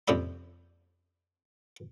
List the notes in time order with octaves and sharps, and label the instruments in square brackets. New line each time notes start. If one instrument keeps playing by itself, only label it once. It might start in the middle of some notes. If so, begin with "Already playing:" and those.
[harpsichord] F2 C3 D4 E5 B5